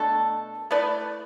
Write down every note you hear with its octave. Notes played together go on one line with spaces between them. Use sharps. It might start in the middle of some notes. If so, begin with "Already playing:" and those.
Already playing: B2 A3 D4 A4
A3 E4 B4 D5